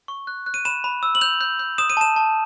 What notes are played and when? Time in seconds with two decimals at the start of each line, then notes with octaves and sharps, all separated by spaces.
0.08 C#6
0.27 F#6
0.46 F#6
0.54 D#7
0.65 B5 E7
0.84 B5
1.03 E6
1.15 F#7
1.21 G6 F7
1.41 G6
1.59 G6
1.78 D#6 E7
1.90 D#7
1.97 A5 E7
2.16 A5